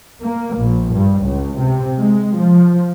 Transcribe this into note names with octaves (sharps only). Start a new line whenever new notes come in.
A#3
A#1
G2
C#2
C3
G#3
F3